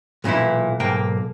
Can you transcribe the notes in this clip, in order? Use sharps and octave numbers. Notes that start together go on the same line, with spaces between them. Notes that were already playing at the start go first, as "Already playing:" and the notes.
B1 A#2 D#3 E3 E4
B1 G#2 A#3 G5